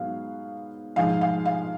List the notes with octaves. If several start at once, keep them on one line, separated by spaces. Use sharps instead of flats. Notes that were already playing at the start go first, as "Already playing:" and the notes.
Already playing: G#2 F#3 B3 F5
G#2 F3 G#3 F5
F5
F5